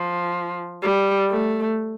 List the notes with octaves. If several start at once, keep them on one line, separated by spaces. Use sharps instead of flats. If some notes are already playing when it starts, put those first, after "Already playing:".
Already playing: F3
G3
A3